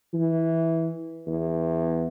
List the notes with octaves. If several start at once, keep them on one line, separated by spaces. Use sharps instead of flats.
E3
E2